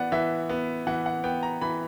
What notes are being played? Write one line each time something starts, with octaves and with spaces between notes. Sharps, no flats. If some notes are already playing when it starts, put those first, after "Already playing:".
Already playing: E3 B3 D5 F#5
E3 E5
B3
E3 F#5
F#5
B3 G5
A#5
E3 B5